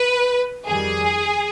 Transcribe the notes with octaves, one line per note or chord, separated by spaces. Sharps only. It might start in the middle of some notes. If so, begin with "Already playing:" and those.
Already playing: B4
F2 D#3 G3 G#4